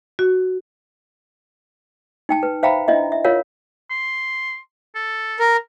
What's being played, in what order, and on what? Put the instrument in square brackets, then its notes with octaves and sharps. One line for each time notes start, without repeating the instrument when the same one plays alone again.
[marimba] F#4
[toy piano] D#4 G5 A5
B4
C5 E5 F5 G5 A#5 B5
D4 E4 D#5 E5
E5
F4 A#4 C#5 F5
[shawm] C6
A4
[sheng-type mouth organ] A#4